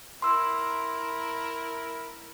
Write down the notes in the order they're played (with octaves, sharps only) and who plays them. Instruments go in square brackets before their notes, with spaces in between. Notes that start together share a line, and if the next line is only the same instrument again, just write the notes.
[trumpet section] E4 A#4 [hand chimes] C6 E6